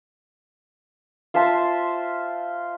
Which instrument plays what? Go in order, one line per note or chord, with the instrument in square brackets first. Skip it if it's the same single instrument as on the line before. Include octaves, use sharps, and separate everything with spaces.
[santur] F4 C5 E5 A5